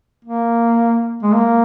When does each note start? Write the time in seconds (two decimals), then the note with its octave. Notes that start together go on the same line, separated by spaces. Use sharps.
0.25 A#3
1.23 G#3
1.33 A#3